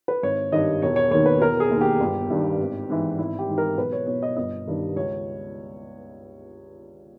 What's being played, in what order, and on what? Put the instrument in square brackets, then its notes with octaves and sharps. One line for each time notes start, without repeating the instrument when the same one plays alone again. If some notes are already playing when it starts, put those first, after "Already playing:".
[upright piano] B4
G#1 C#5
G2 D#3 D#5
E1 C#5
C#5
D#2 D#3 C#5
B4
E1 A#4
G#4
D#2 D#3
G4
G1
G2 D#3
G#1
G#2 E3
G#1 E4
G4
G#2 E3
A#4
B1 B4
C#5
B2 C#5
D#5
G1 D#5
G2 D#3
C#2 C#5